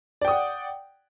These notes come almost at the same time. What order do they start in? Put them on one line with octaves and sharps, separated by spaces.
D5 G5 D#6 F#5